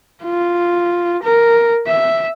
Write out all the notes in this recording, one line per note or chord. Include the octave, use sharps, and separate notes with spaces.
F4
A#4
E5